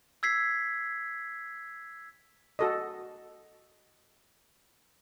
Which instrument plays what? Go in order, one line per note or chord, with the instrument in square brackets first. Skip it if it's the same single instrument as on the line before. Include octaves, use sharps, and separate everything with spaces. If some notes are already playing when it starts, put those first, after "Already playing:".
[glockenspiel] E6 G#6 B6 C7
[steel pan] F#4 A4 D#5